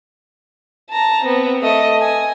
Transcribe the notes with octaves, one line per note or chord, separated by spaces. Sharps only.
A5 A#5
B3 C4
A3 D#5
G#5